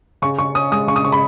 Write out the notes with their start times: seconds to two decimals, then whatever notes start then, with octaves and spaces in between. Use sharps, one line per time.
0.22 C#3 C#6
0.39 C#3 C#6
0.55 C#4 D#6
0.72 G#3 D#6
0.87 C#3 C#6
0.96 D#6
1.04 C#3 C#6
1.12 B5